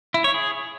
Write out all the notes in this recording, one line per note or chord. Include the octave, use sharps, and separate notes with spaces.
E4
C#5
G#4